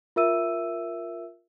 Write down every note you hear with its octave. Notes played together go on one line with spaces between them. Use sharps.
F4 A#4 E5 E6 D#7